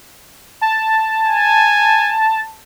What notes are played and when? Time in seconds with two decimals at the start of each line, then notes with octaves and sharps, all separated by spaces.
0.61 A5
1.24 G#5